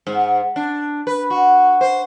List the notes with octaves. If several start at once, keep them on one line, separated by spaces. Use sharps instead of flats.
G#2
D4
B4
F#4
C5